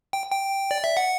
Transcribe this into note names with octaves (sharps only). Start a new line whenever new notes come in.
G5
G5
D5
E5
F#5